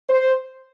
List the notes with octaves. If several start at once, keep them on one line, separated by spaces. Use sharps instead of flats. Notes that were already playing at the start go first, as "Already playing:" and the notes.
C5